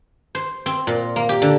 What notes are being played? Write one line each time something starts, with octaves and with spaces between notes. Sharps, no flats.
C5
C4
A#2
A#3
G4
D3